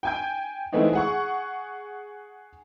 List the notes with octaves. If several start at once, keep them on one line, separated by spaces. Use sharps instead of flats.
G5 G#5 G6
E3 G#3 A3 B3 C4 D#4
G#4 F#5 C#6